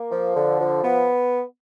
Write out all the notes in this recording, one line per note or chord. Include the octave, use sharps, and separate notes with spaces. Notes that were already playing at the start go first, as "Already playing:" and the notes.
Already playing: A#3
F3
D3
F3
B3